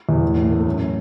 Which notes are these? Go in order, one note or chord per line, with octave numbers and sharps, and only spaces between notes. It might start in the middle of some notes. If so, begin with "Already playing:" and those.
E2
A2
A2
A3
F#2